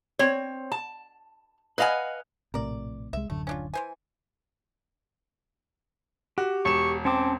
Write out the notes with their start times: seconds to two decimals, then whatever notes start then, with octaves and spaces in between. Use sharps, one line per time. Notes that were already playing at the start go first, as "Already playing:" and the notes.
0.19 C4 C#5
0.72 A5
1.78 B4 D#5 F5 F#5 G#5
2.54 A#1 A2 C3 A#4 D5
3.13 C2 G#3 E5
3.30 D1 F#2 D3 A3
3.47 C#4 D4 F4
3.74 E3 C5 G#5
6.38 F#4 G4
6.65 E1 C#6 E7
7.05 C4 C#4 A5 D6